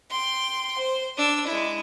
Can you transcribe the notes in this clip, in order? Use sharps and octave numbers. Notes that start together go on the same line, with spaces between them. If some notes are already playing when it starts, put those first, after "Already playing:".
G5 C6
C5
D4 E6
G#3 E4